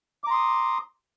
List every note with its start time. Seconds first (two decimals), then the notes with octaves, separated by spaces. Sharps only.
0.24 D6
0.27 A#5
0.31 C6
0.34 D#6